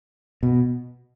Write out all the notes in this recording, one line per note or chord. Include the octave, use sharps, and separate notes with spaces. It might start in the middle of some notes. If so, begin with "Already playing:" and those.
B2